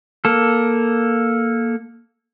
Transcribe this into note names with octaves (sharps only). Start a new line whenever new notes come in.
A#3 A4